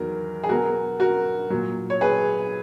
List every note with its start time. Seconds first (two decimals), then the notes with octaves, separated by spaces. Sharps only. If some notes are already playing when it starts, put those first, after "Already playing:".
Already playing: E2 D#3 F#3 A#4
0.44 G#4
0.49 B2 F#3 F#4 A#4
1.00 F#4 A#4
1.50 A#2 F#3
1.90 C#5
2.01 G#4 B4